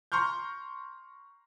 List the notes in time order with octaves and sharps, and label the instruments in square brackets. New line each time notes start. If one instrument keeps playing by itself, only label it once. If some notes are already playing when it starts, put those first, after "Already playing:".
[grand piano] A#5 C6 C#6 F6 G6